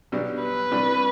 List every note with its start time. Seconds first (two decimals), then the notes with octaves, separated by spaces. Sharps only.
0.12 B1 B2 G3 D4
0.42 B4
0.72 C2 C3 G3 D4